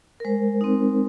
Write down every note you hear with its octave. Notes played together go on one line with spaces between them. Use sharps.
A#4
G#3 C5
C4 D#4